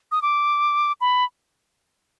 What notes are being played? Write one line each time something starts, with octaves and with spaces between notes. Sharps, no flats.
D#6
D6
B5